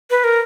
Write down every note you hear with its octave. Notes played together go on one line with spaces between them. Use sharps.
B4
A#4